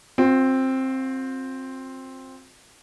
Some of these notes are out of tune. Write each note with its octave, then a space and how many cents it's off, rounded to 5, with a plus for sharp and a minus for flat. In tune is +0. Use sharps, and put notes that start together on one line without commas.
C4 +10 F4 +45